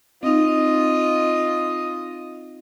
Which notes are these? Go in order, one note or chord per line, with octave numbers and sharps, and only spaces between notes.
C4 D#4 F4 D#5